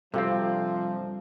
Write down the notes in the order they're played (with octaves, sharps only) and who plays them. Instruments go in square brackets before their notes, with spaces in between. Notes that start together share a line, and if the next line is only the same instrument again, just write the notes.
[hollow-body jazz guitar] G2 [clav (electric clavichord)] C3 C4 [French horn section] F3 [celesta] A4 F5